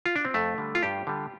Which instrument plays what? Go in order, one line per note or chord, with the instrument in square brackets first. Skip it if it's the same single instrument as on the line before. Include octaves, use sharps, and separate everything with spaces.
[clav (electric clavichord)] F4
D4
C4
F2 A3
D3 G3
F4
G2 G4
D3 G3